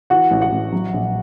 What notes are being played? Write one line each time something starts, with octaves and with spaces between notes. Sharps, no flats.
E3 F#4 F#5
A1
F#4 F#5
A1
F#3
A#1